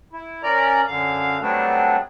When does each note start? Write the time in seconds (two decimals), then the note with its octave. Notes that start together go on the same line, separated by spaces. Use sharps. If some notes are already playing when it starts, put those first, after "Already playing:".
0.13 E4
0.43 C#4 A#4 D5 A#5
0.87 F#2 D3 F5
1.41 F#3 G3 A3 B3 C4 D4